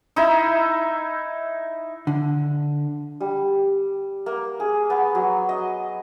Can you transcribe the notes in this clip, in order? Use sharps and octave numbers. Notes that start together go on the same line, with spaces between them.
D#4 E4 E5
D3
G3
A#3
G#4
B3
F#3
D#5